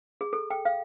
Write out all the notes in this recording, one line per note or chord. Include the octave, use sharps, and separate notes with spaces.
G#4
A4
G5
F5